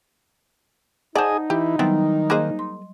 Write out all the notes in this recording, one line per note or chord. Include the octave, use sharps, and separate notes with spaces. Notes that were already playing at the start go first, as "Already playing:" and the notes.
D#4 G#4 C5 D5 D#5 F#5 G#5 A5
E3 E4 G4
D#3 F#3 G3 B3 C4 E4
A#3 G#4 C5 D#5 F#6
C6